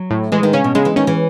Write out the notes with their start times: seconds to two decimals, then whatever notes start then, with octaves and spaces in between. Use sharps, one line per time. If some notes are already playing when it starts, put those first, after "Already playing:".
Already playing: F#3
0.11 A2
0.32 E3 G#3
0.43 D#3
0.53 C#3 C#4
0.64 B2
0.75 C#3 G#3
0.85 E3
0.96 D#3 C#4
1.07 E3